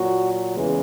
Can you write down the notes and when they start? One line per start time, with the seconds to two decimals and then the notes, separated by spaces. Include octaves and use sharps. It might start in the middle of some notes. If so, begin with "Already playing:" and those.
Already playing: A#2 F#3 F#4
0.54 E2 C#3 E3 G#3